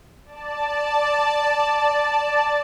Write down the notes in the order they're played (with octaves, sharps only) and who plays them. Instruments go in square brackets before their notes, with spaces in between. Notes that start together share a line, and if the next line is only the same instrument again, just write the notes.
[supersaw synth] D5 A5